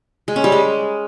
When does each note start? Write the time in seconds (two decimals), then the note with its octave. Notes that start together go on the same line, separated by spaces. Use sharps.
0.28 G#3
0.36 C#4
0.44 G3
0.52 G#3